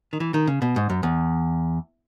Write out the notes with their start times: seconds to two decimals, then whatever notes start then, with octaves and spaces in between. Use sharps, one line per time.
0.13 D#3
0.20 E3
0.34 D#3
0.47 C#3
0.62 B2
0.76 G#2
0.90 F#2
1.03 E2